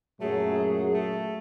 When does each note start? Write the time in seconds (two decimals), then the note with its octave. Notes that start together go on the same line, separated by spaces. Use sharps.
0.21 F#2 A#2 F#3 A3 G#4
0.94 A3